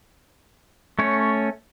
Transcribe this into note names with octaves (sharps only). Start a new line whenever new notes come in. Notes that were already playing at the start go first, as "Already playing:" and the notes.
A3 C#4 C#5